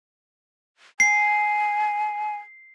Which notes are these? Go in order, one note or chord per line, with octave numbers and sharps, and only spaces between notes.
G#5 C7